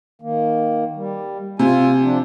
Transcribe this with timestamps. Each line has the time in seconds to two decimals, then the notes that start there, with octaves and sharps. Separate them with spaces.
0.22 D#3 A#3
0.96 G3
1.59 C3 F4 G#5
2.02 F3 D4